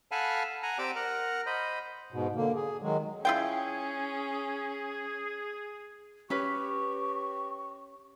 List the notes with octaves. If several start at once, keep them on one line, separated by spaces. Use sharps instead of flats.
A4 F5 F#5 G#5 A5 B5
F#5 G#5 A#5
C4 G4 D5 D6 E6
A#4 F#5
C5 D#5 B5
G#2 B2
D3 A#3
G#4
D#3 F#3 G#3
C#4 E4 F4 G#4 G5
C#4 G4 B4 C#6